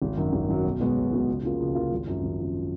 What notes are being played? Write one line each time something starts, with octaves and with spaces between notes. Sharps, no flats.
G#1
F#2 D#3 F#3
G#1
F#2 D#3 F#3
B1
B2 G#3 B3 F#4
B1
B2 G#3 B3 F#4
C#2
C#3 F3 A#3 F4
C#2
C#3 F3 A#3 F4
G#1
F#2 F3
G#1
F#2 F3